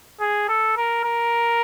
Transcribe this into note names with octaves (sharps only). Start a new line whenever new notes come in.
G#4
A4
A#4
A#4